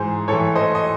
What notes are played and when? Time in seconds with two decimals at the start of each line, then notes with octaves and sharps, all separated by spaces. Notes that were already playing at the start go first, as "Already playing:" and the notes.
Already playing: G#2 E3 G#4 C5
0.28 A2 A4 C#5
0.33 E3
0.55 C5 D#5
0.75 D#5